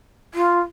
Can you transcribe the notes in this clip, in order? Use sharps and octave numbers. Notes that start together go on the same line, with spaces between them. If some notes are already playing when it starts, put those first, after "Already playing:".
F4